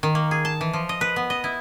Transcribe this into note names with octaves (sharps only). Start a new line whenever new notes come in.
D#3
A#3
G#4
A5
E3
F3
D#5
B4
B3
D#5
E4